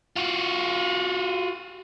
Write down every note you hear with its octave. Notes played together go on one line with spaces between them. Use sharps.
F4 F#4